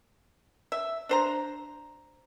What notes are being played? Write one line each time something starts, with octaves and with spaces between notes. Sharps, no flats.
E5
D4 C5 A#5